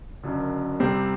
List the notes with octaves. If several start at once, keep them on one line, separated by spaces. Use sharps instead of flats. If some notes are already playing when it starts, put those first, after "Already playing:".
F#1 F#2 D3
C2 C3 G3 C4